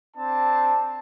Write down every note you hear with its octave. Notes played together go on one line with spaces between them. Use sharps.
C4 D4 A5